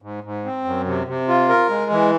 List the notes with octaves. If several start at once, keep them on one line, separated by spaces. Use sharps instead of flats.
G#2
G#2
C4
F#2
C3
C3
F4
A#4
G#3
E3